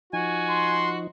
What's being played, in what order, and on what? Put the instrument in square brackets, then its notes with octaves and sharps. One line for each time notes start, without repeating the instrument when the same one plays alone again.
[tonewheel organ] F3 D#4 [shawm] F#4 [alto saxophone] G#5
[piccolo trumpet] C6